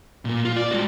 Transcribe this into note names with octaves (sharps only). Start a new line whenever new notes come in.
A#2 A#3
F4
D5
G#3 F#4